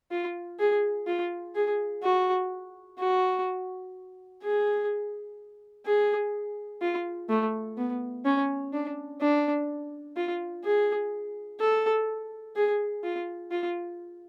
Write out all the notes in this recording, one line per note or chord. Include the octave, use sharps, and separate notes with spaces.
F4
G#4
F4
G#4
F#4
F#4
G#4
G#4
F4
A3
B3
C#4
D4
D4
F4
G#4
A4
G#4
F4
F4